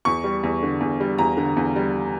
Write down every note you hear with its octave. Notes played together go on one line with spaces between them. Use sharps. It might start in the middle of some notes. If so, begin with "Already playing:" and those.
E2 C#6
G3
E2
D3
E2
G3
E2 A#5
D3
E2
G3